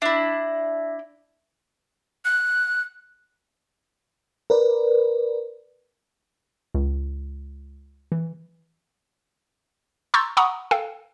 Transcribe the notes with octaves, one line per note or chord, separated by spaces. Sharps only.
D4 E4 E5
F#6
A#4 B4 D5
C#2
E3
A#5 C6 C#6 E6 G6 A6
F#5 A#5 B5 C#6 D#6
A4 F5 G5